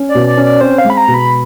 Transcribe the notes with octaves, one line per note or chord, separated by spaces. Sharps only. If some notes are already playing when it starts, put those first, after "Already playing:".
Already playing: C#4
D5
B2
D5
C#4
D5
C4 C5
F5
G#3
B5
A#5
B2
B5